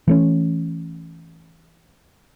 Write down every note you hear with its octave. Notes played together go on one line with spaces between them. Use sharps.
E3 A3 C#4